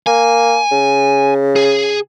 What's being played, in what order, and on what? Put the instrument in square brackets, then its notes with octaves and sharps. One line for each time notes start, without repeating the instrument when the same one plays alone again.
[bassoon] A#3 [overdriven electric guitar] G#5
[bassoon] C#3
[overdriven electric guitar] G#4